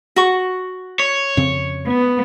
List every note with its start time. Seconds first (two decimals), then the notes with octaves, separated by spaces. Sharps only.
0.16 F#4 C#6
1.00 C#5
1.37 F2 C#3 C4
1.86 B3